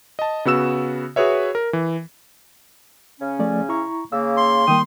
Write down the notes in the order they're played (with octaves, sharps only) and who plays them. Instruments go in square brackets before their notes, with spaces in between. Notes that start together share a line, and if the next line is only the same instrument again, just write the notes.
[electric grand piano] D#5 A5
C#3 B3 F#4 E6 E7
F#4 G#4 B4 C#5 E5
A#4
E3
[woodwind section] C#3 C#4
[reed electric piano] F3 A3 D5
E4 A#5 C#6
[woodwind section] C#3 A#3 [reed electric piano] E6
[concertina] C6
[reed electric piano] D#3 G3 A#3 [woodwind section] G5 D#6